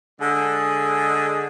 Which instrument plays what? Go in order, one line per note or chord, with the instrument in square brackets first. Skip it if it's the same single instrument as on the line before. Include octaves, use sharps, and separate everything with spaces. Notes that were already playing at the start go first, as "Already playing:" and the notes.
[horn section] D3 G#3 G#4